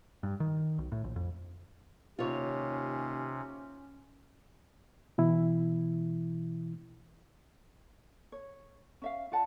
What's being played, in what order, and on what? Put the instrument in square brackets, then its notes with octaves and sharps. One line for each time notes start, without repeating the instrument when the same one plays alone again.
[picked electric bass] G2
D#3
B1
A2
A#1
F2
[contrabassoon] D#2 [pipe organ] C3 [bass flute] C#4 [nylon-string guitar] F4 C#5
[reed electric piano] B2 E3 E4
[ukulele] C#5
C#4 E5 F5
F4 D5 F#5 A5